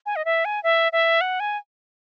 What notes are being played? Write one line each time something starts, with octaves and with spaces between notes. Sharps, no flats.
G#5
D#5
E5
G#5
E5
E5
F#5
G#5